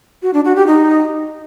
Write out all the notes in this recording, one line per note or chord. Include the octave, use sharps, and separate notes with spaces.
F#4
D4
F#4
G4
D#4